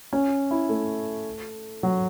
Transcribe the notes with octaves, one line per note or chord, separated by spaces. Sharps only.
C#4
E4
A3
F#3